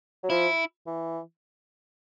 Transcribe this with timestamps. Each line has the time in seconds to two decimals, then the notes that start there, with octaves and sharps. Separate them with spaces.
0.23 F#3
0.30 F3 E4
0.86 E3